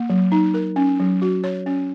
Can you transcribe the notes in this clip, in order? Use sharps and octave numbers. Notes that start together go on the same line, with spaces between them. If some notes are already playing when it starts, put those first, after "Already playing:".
Already playing: A#3
F#3
D#4
A#4
C#4
F#3
F#4
C#5
C#4